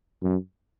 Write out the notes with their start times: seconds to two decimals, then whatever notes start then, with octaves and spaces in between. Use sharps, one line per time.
0.22 F#2